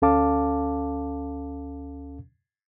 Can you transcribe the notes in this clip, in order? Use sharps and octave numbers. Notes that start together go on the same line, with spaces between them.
D2 C#4 A4 F5 A5 D6